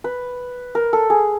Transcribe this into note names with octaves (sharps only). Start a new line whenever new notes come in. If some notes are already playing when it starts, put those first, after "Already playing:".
B4
A#4
A4
G#4